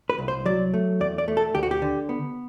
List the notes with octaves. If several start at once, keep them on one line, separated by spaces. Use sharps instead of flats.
B4
C2
C5
F#3 D5
A3
E2 D5
D5
A3
A4
D2 G4
F#4
G4
D3
B3